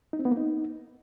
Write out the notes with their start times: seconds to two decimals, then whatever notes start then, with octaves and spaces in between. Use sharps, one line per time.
0.13 D#4
0.19 C4
0.25 B3
0.31 A#3
0.37 D#4